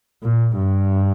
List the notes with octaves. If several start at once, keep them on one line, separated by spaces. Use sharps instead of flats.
A#2
G2